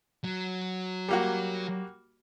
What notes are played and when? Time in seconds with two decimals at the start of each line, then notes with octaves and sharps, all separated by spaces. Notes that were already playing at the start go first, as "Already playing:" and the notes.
0.24 F#3
1.09 G3 A#3 F#4